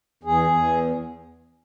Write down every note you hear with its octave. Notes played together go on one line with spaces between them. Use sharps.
E2 G#4
E2